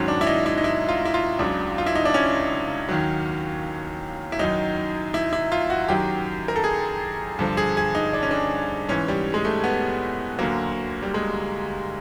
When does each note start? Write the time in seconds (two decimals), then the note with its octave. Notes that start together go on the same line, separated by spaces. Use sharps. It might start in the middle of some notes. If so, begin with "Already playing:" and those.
Already playing: G#2 D#3 F#3 C#4
0.08 D4
0.21 E4
0.27 D#4
0.46 E4
0.58 D#4
0.64 E4
0.89 F4
1.05 E4
1.14 F4
1.39 C#2 C#3 F#3 D4
1.78 F4
1.86 E4
1.95 D#4
2.05 D4
2.14 C#4
2.89 D#2 D#3 F#3
4.32 E4
4.39 F#2 D#3 F#3 D#4
5.14 E4
5.33 E4
5.52 F4
5.70 F#4
5.88 F#2 D#3 F#3 G4
6.48 A#4
6.56 A4
6.64 G#4
7.39 G2 D3 F3
7.57 G#4
7.77 G#4
7.95 D#4
8.13 D4
8.23 C#4
8.31 D4
8.88 G#2 E3 C#4
9.08 G3
9.34 G#3
9.45 A3
9.64 B3
10.38 D2 D3 F#3 A#3
11.03 G3
11.14 G#3